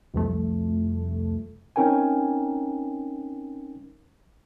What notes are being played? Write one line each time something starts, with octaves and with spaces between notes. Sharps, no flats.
C2 F2 A3
C4 C#4 D#4 A#4 G5 G#5